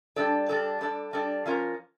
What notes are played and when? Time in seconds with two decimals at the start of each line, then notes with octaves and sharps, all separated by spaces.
0.16 G3 D4 A4 D5
0.48 G3 D4 A4 D5
0.81 G3 D4 A4 D5
1.13 G3 D4 A4 D5
1.46 F3 C#4 F4 A#4